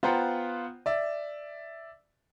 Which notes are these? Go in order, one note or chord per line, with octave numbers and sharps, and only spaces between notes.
B3 F4 C5 F#5 G5 A#5
D5 E5